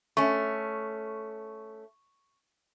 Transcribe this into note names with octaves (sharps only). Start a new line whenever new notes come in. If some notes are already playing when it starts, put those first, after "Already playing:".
A3 C#4 C#6